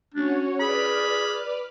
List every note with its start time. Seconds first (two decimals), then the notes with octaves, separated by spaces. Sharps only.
0.14 C#4 D4 F#4 C#5
0.60 G#4 B4 D5 B5 F6